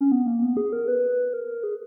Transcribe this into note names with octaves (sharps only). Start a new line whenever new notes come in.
C#4
B3
A#3
B3
G#4
A#4
B4
A#4
G#4